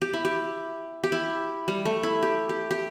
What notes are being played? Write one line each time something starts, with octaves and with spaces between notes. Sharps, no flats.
G4
E4
G4
G4
E4
G3
A3
E4
G4
G4
G4